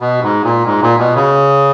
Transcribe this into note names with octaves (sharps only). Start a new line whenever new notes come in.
B2
G#2
A#2
G#2
A#2
B2
C#3